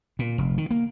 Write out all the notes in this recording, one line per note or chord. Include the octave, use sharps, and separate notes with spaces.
A#2
F1
D#3
A#3